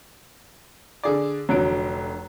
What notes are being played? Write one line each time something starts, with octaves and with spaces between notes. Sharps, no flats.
D3 G#4 D5
F1 D3 F#3 D7